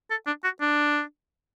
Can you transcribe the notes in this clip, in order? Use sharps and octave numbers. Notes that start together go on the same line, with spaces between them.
A4
D4
F#4
D4